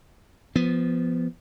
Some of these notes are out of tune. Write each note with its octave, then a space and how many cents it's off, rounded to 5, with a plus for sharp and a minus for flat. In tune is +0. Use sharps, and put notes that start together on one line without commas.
F3 -10 B3 +0